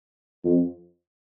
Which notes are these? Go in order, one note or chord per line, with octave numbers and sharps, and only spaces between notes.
F2